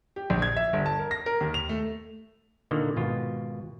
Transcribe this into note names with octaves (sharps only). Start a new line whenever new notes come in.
G4
A#1
G#6
E5
G1
A5
A#4
A#6
A#4
D#2
F7
A3
A#2 D3 D#3 A#3
G#1 B2 F4